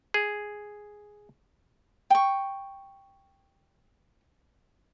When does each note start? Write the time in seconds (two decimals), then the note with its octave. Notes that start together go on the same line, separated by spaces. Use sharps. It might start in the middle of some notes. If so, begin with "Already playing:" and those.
0.14 G#4
2.10 G5 C#6